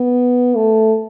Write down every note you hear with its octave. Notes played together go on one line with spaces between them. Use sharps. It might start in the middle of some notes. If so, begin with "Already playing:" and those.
Already playing: B3
A3